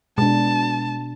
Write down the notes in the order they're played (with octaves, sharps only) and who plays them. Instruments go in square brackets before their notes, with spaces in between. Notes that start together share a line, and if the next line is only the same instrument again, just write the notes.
[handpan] B2 D4 [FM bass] G#3 [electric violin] A5